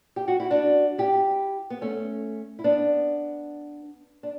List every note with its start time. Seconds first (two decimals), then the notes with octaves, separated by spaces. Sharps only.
0.16 G4
0.28 F#4
0.40 E4
0.51 D4 F#4
0.98 E4 G4
1.70 B3
1.81 A3 C#4
2.59 E4
2.64 B3 D4
4.23 D4